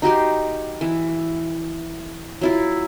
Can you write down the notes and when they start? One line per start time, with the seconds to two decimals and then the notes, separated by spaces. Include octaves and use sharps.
0.02 D#4 F#4 G4 C6
0.81 E3
2.41 F#3 E4 F4